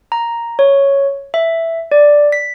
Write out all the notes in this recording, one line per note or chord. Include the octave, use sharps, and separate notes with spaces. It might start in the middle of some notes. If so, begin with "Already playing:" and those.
A#5
C#5
E5
D5
B6